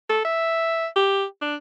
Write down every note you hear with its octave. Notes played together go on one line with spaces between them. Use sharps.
A4
E5
G4
D4